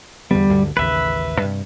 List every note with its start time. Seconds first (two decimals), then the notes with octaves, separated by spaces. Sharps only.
0.31 E2 D3 G3 B3
0.49 D2 G2 D3
0.77 A1 D#2 C#3 B4 E5
1.42 G2 C3